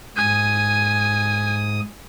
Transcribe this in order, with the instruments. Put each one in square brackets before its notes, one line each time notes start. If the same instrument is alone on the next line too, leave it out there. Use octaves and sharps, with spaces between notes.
[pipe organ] G#2 D#6 [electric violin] G#5